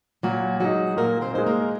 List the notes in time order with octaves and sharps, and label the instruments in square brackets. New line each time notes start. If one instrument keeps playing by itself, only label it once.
[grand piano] A#2 [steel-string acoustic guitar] F#3 F#4
[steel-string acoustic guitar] F#3 F#4 [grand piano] G#3 D#4
[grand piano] A#2 [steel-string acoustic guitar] A#3 A#4
[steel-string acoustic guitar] C4 C5
[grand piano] G#3 D#4 [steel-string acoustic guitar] C5
[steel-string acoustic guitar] A#3 A#4